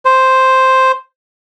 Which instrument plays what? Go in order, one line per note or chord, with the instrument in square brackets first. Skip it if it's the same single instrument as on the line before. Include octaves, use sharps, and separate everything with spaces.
[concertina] C5